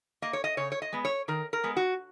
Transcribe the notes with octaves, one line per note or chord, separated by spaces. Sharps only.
A#3 D#5
C#5
D#5
C#3 C#5
C#5
D#5
G#3 B3
C#5
D#3 A#4
A#4
G#3 B3
F#4